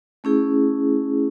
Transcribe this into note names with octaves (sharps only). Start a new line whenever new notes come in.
A3 C#4 E4 G#4